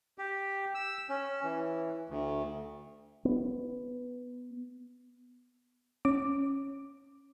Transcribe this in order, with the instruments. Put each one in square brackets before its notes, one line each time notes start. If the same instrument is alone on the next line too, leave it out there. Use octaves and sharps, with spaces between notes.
[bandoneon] G4
E6
C#4
E3
D2
[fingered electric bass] B3
[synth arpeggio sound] C#4 D6